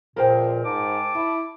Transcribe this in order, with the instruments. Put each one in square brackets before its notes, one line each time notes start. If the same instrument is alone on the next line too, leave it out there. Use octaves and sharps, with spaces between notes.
[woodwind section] C#2 A#2 [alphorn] F3 [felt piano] A#4 C5 G5
[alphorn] G#2 [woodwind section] A5 D6
[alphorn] E4